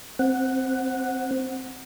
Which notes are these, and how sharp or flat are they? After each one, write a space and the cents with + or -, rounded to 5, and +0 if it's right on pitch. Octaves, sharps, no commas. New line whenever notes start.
C4 +0 F#5 +0